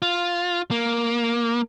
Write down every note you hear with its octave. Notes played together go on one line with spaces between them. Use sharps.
F4
A#3